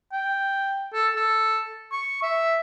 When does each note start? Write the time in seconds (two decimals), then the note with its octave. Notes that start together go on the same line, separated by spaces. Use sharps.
0.12 G5
0.93 A4
1.16 A4
1.92 C#6
2.22 E5